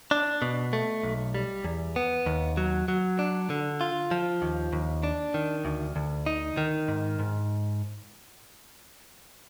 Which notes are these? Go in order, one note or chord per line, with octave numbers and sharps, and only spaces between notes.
D4
B2
A3
B1
G3
E2
B3
D#2
F#3
F#3
D4
D3
F4
F3
D#2
D#2
D4
D#3
D2
D2
D#4
D#3
G#2
G#2